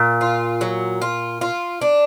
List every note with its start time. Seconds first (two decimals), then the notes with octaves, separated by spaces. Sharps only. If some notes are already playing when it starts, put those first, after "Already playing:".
Already playing: A#2
0.21 F4
0.61 F#3
1.02 F4
1.41 F4
1.81 D4